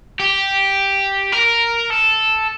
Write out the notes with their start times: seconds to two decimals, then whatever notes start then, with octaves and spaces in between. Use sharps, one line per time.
0.19 G4
1.33 A#4
1.90 A4